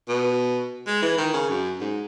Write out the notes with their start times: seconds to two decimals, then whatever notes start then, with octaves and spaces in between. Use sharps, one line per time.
0.09 B2
0.87 G#3
1.02 E3
1.18 D#3
1.33 C#3
1.50 F#2
1.80 G#2